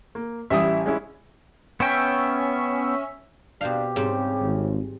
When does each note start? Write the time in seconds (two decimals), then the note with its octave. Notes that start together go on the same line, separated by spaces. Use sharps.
0.15 A#3
0.50 A1 G3 E4 E5 D#6
0.86 G#3 C#4 E4
1.80 B3 C#4 E5 G5
3.61 B2 D4 G4 C5 F5
3.96 G#2 C#3 G3 C4
4.42 G#1